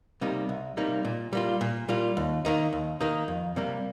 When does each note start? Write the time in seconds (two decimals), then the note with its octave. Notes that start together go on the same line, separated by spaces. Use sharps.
0.21 C3 G3 A#3 D#4
0.49 C2
0.77 C3 G3 A#3 D#4
1.05 A#2
1.33 G3 A#3 F4
1.61 A#2
1.88 G3 A#3 F4
2.17 D#2
2.45 D#3 A#3 D#4
2.73 D#2
3.01 D#3 A#3 D#4
3.28 F2
3.56 C3 G3 A#3